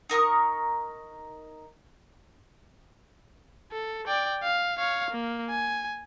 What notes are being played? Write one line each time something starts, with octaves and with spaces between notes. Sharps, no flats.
D#4 A#4 C#6 D#6
A4
D5 G5
F5
C#5 F5
A#3
G#5